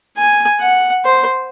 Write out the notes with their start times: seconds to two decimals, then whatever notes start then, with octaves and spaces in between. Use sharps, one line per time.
0.17 G#5
0.61 F#5
1.05 C5